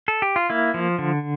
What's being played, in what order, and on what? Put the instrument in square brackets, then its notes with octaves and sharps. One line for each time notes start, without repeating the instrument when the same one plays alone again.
[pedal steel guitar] A4
G4
F4
A#3 E4
F3
D3